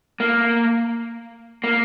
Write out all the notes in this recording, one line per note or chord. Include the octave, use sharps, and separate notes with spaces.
A#3
A#3